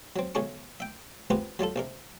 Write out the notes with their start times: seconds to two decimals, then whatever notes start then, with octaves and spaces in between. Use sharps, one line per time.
0.16 F#3 C4
0.35 B1 D3 G#3 C#4 C#6
0.80 E5 G5
1.30 B3 C4 F4 G4 G#4 B4
1.59 F#3 G3 F4 A4
1.76 A#1 C3 A#4